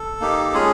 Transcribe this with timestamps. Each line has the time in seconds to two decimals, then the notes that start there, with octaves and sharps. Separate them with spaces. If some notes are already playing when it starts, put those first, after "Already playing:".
Already playing: A4
0.20 A#3 D#4 G4
0.53 G#3 C#4 F4 G#4